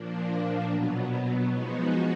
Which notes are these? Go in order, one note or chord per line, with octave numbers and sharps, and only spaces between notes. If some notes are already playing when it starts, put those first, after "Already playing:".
Already playing: A#2 F3 A#3 D4
B2 F#3 B3
F3 G#3 B3 D#4 F#4